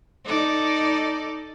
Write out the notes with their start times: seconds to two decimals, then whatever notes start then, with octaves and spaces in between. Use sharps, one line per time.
0.25 D#4 A4 D5